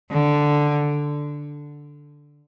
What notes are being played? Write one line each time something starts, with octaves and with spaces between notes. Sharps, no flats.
D3